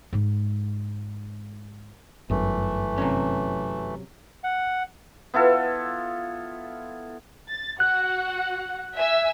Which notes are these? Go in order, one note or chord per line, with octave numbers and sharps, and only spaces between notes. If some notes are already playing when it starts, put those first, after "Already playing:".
G#2 G#3
G1 F#2 E3 A3
C3 F#3 C#4
F#5
B3 E4 F4 A4
A6
F#4 F#5 F#6
E5 G#5 E6